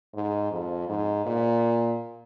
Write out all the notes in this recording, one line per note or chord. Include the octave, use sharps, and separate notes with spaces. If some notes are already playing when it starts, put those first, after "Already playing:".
G#2
F2
G#2
A#2